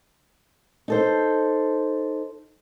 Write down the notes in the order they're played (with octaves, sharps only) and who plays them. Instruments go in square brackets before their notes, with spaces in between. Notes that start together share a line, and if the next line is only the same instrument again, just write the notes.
[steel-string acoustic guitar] D#4 A4 C5